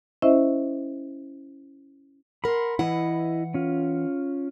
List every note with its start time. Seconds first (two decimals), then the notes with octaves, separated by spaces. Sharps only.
0.22 C#4 E4 C5 D#5 E5
2.44 A#4 F#5 B5 C6
2.79 E3 E4 B4 D#5 F#5
3.54 C#4 F4